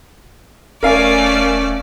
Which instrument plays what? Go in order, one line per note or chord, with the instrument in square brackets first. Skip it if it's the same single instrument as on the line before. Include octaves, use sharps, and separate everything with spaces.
[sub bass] E1 [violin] A3 D5 [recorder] C#4 [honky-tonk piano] A#4 F5 G#5